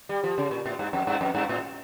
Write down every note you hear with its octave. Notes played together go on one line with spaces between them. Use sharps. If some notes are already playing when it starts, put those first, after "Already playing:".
G3
F3
C#3
A#2
A2
G2
F2
G2
F2
G2
A2